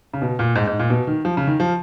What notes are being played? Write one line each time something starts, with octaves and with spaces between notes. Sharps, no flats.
C#3
B2
A#2
G#2
G#2
A#2
B2
D#3
F3
C#3
D#3
F3